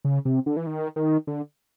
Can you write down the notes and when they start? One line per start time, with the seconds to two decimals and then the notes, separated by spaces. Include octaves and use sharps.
0.04 C#3
0.25 C3
0.46 D3
0.57 E3
0.67 D#3
0.96 D#3
1.27 D3